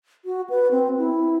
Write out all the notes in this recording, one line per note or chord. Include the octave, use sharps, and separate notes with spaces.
F#4
B4
C4
E4